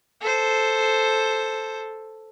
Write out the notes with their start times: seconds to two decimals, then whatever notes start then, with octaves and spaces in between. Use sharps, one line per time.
0.21 A4 C5